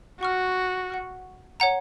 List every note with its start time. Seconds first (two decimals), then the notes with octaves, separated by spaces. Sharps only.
0.21 F#4 F#5 C#6 F6
0.90 F#5 C#6 F6
1.60 C#5 F#5 A#5